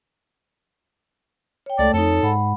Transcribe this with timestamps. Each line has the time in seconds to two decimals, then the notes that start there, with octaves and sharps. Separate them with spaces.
1.66 C#5 G5
1.79 C#2 A3 A4 D5
1.94 F2 D#4 A4 C#5
2.23 G#2 G#3 F#5 B5